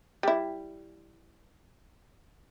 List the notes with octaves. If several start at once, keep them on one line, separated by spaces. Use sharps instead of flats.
G3 E4